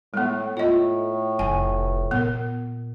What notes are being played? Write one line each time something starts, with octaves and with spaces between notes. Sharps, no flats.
A2 G#3 B3
A2 F4 D#5
F1 G#5
A#2 B3 A#4